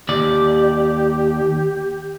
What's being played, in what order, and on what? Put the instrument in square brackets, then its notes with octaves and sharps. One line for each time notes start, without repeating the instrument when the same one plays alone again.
[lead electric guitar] D#2 D5 [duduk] G4